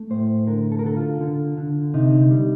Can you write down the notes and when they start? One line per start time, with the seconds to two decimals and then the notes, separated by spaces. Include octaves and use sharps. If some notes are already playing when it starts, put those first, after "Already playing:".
Already playing: A3
0.11 A2 C5
0.47 D3 A#4
0.72 A4
0.79 A#4
0.84 D3 A4
0.97 F4
1.21 D3
1.57 D3
1.94 C3 D#4
2.31 G3